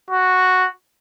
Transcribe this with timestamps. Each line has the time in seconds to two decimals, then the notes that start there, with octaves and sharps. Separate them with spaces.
0.10 F#4